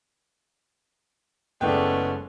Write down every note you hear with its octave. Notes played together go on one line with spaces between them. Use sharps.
F#1 G#3 A3 B3 C#4 D5 G5